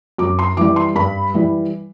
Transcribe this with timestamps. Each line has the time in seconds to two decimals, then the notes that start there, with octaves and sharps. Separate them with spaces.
0.18 F#2 D6
0.39 C6
0.57 E3 G3 D6
0.76 C6
0.96 G2 B5
1.34 E3 G3